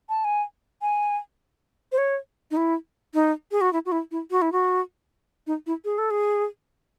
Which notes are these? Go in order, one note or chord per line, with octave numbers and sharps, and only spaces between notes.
A5
G#5
G#5
C5
C#5
D#4
E4
D#4
G#4
F#4
E4
F#4
E4
E4
F#4
E4
F#4
D#4
E4
G#4
A4
G#4